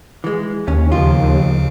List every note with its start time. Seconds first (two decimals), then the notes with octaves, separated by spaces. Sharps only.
0.24 E3 G#3
0.68 D#2 C#4
0.92 D2 C#3 F3 F4